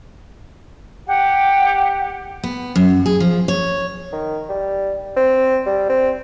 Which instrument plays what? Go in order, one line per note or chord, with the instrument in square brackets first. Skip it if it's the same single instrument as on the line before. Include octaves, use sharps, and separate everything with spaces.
[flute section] G4 F#5
[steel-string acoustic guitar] B3
F#2
G#4
F3
C#5
[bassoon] D#3
G3
C4
G3
C4